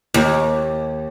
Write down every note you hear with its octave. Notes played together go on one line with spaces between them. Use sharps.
D#2